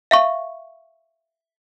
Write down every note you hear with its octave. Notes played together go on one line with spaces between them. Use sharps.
E5 F5 C#6